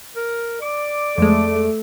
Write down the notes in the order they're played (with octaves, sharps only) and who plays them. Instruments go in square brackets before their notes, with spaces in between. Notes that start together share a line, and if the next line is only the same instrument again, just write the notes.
[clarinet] A#4
[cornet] D5 [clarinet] D6
[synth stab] F2 G#3 [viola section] A3